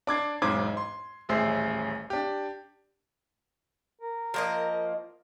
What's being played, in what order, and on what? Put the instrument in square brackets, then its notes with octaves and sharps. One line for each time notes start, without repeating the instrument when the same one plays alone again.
[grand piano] D4 D6 G#6 C7
E1 B1 G#2 C5 D6 G#6
C6
D#1 A1 G#4 C5 E5 C7
D4 G4
[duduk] A#4
[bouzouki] F3 A#3 D#5